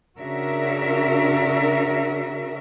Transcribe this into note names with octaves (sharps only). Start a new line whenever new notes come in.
C#3 D4 F#4 A#4 E5